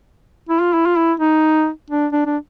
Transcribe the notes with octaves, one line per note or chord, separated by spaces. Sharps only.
E4
F4
E4
F4
E4
D#4
D4
D4
D4